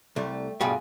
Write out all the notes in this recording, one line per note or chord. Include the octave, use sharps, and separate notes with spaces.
C2 G3 A3
G2 B2 G3 F4 F#4 G#4